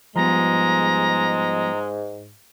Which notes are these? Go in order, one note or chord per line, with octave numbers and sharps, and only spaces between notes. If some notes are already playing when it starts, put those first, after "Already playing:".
G#2 F3 G3 G#3 B3 A#5